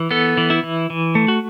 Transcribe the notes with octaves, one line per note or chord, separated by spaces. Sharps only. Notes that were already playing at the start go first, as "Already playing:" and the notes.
Already playing: E3
B3 A4
E3
E4
E3
E3
A3
F#4